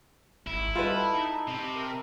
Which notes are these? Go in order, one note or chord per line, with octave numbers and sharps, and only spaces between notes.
G#1 E4
G3 F4 A4 B4 D#5 B5
D#4
C3
A#4